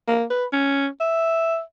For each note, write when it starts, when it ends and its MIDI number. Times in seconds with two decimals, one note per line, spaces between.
0.08 0.25 58
0.30 0.45 71
0.53 0.87 61
1.00 1.61 76